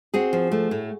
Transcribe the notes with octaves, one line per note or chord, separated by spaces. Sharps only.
C4 F#4 G#4
F3
A3
A2